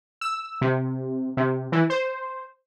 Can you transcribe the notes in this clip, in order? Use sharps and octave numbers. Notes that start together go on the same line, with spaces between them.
E6
C3
C3
E3
C5